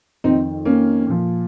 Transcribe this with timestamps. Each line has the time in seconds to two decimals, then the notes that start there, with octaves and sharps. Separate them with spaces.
0.24 F2 D#3 C4 D#4
0.65 A#3 C#4
1.07 A#2 F3